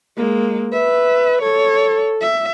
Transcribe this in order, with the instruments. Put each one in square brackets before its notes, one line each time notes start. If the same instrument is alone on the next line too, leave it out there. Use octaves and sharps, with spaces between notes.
[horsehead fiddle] G#3 A#3
[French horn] B4 [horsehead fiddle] E5
[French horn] A4 [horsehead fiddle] C#5
[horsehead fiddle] E5